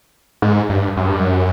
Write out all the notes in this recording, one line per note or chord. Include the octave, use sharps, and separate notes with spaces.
G#2
G2
F#2
G2
F#2